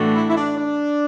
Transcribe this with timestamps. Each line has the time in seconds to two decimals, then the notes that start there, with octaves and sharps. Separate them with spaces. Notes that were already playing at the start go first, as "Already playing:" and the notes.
Already playing: A2 E3 A3 D4 F#4
0.15 E4
0.28 E4
0.36 D4
0.57 D4